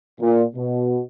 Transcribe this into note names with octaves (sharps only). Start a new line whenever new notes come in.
A#2
B2